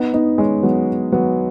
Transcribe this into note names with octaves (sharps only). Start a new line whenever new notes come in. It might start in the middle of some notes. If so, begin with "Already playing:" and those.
Already playing: B3 D#4
B3 D#4
G#3 C#4
F#3 B3
F#3 B3